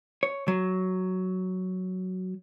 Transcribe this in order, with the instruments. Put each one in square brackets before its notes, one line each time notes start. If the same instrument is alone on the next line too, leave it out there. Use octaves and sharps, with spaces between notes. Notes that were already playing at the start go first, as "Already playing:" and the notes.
[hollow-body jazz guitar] C#5
F#3